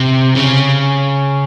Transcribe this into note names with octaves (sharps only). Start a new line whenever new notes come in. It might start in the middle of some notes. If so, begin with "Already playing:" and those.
Already playing: C3
C#3